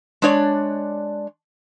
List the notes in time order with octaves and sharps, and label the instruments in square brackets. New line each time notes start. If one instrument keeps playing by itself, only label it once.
[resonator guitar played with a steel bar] G#3 D4 C#5 D5